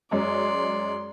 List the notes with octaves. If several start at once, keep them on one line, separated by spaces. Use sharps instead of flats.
F#2 G#3 C#4 D5 C6